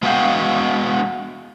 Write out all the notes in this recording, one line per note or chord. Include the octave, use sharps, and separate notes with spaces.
G#3 B3 F#4 G#4 F5 G5